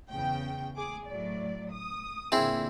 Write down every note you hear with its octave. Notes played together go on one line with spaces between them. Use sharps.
E2 C#3 G5
G#4 D6
A2 F#3 D5
D#6
A#2 D3 A#3 C4 E4 G#4